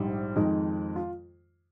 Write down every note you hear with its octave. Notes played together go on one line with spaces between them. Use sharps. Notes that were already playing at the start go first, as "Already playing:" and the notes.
Already playing: A#1 G#2 G3
F2 D#3 G#3 D#4
F4